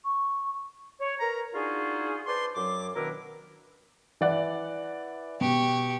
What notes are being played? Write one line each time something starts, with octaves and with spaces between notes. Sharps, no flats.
C#6
C#5
A#4 B4 A#5
D4 D#4 F4 F#4 G#4
B4 C5 D5 A5 C6
F#2 F#3 D6
B2 D#3 D4 E4 A#4
E3 D5 F#5
B2 G4 C#6